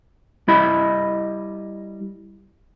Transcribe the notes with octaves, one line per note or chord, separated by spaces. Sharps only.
G3 E4 D#5 B5